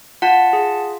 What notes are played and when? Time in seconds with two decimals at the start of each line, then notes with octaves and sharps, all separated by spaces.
0.22 F4 F#5 A5
0.53 G#4